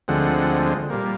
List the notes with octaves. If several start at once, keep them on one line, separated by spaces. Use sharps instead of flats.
D2 D3 F3 G#3 C4 F#5
A#2 G3 A#3